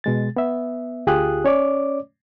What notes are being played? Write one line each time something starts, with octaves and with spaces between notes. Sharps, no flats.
B2 G#3 A6
B3 E5
D2 F4 G4 G#4 D#6 F#6
C#4 C#5 D5 D6